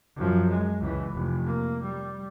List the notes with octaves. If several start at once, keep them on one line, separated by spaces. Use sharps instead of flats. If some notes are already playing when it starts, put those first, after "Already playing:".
F#2 F3
G#3
C#2 E3
F1
A#3
G3